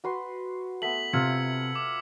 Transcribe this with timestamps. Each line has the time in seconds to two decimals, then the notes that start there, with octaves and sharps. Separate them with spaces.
0.04 F#4 B4 C6
0.82 A3 B3 B6 F#7
1.13 C3 F4 E6 G#6 C#7
1.75 D6